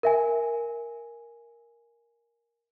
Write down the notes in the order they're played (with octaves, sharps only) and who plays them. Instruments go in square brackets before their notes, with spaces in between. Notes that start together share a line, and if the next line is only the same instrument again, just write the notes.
[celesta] A#4 E5 G#5